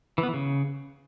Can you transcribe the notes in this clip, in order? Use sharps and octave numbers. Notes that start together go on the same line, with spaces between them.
E3
B3
E3
C#3